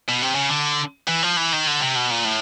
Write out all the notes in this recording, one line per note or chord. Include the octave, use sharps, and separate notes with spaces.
B2
C3
C#3
D3
E3
F3
E3
D#3
D3
C3
B2
A#2
A2